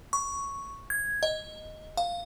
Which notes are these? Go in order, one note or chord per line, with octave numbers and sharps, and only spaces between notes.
C#6
G#6
D#5
F5